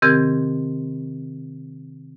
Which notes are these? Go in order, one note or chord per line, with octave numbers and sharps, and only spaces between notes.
C3 D#3 C4 G4 A#4 G#6